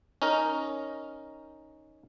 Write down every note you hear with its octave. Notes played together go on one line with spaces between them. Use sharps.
C#4 D#4 A#4